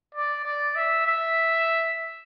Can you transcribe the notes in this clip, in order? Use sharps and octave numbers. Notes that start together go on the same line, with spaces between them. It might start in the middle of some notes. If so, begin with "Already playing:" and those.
D5
D5
E5
E5